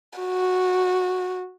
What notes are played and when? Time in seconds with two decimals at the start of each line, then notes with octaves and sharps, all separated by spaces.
0.19 F#4